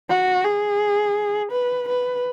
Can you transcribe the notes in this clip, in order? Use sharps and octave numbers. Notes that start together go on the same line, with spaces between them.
F#4
G#4
B4
B4